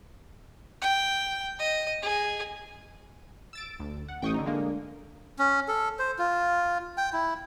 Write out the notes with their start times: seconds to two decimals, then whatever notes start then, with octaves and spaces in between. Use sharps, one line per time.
0.82 G5
1.59 D#5
2.02 G#4
3.53 E6 A6 D7
3.79 D2
4.08 F#5
4.22 A1 G5 C#6 D#6
4.34 D3 D#4
4.46 D3 G#3 A#3
5.39 C#4
5.68 A4
5.99 C5
6.19 F4
6.97 G5
7.13 E4